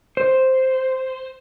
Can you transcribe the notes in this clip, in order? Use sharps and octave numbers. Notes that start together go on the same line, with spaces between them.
C5